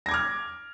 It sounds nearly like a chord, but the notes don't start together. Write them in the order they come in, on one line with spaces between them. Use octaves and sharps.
A#6 G#6 D6 F6